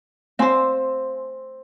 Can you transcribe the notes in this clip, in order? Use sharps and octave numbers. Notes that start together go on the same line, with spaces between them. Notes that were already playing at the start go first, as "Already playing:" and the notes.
C4 C5 F5 G#5 C6